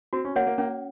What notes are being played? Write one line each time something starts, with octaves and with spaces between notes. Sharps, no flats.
C4 F#4
C#4
A#3 C#5 F#5
A#3
A#3 C#4